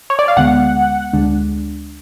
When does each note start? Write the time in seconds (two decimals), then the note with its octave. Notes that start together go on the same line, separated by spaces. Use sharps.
0.10 C#5
0.19 D5
0.28 F5
0.37 D2 D3 G#3 B3 F#5
1.13 D2 D3 G#3 D4